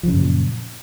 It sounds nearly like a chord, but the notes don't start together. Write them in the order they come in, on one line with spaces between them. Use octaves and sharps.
F3 C#3 F#2 A#2